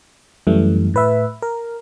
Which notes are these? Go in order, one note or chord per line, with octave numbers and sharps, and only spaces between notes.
F#2 E3 G3 A3
A2 B4 E5
A#4